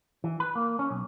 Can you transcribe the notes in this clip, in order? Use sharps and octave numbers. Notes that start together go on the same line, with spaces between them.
E3
B4
A#3
C#4
B1